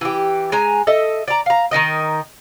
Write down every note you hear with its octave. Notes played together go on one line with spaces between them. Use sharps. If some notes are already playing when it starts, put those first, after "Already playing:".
E3 G4
G#3 G#5 A#5
A4 D#5 E5
D5 A#5
F5 A#5
D#3 D#4 A#4 D#5